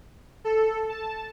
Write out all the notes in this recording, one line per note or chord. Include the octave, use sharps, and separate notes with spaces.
A4
A5